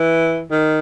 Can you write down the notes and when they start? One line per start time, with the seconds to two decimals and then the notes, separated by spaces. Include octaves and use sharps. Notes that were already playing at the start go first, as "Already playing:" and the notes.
Already playing: E3
0.51 D#3